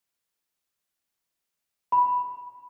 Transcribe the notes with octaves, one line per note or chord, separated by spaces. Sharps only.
B5